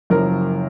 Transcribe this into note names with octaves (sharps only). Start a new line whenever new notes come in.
F#1 F#2 F3 A#4